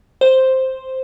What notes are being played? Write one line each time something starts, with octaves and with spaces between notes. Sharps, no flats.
C5